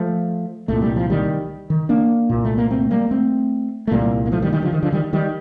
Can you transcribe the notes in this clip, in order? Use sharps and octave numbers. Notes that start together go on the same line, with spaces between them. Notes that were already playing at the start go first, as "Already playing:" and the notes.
Already playing: F3 A3
C2 A#2 A3
G3
F3
D#3 G3
D#3
A#3 D4
C2 A#2
A3
A#3
A3 C4
G3 A#3
A3 C4
A3
C2 A#2 G3 A#3
A#3
F3 A3
D#3 G3
D#3 G3
D3 F3
D#3
D3 F3
D#3 G3
D#3 G3